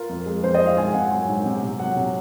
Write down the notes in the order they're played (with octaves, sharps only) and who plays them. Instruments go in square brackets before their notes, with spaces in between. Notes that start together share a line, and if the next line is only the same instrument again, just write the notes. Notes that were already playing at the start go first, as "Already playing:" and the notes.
Already playing: [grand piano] F4 [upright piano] A#4
[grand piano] F2
G#3
[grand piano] F2 [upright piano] C5
[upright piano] D#5
[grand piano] C4
[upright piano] F5
[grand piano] G#2 [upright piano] G#5
[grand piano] C4 [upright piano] F#5
[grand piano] F#3 [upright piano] G#5
[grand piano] G#2
C3
C3
[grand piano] F#3 [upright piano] F#5
[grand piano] C3